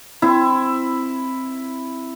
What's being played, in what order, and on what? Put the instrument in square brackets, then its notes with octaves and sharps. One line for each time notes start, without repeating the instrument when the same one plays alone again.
[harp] C4 [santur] E4